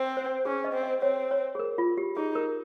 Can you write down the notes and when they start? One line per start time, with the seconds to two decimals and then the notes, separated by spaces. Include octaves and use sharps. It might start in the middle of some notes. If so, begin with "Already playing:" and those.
Already playing: C4
0.17 C5
0.45 C#4 G#4
0.64 D#5
0.73 C4
0.83 D#5
1.02 C4 C#5
1.31 C#5
1.55 G#4
1.59 A#4
1.78 F4
1.98 G4
2.16 D#4 G#4
2.35 A#4